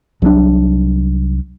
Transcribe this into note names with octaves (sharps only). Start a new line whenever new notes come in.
C2 F#3 G#3 D4